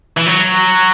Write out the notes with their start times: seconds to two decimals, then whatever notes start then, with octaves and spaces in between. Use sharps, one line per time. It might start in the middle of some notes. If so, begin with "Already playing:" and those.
0.17 E3
0.27 F#3